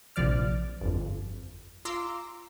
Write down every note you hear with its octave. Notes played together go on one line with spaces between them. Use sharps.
A#1 C3 F3 D5 F6
G1 F2
F4 A#5 C6 D6 E6